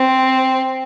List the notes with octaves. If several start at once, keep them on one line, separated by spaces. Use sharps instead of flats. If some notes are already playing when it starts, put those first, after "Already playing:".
Already playing: C4